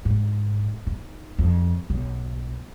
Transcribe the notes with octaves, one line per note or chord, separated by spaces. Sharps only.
G#2
D#4
F2
B1